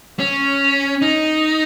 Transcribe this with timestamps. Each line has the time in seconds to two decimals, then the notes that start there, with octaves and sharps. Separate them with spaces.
0.19 C#4
1.02 D#4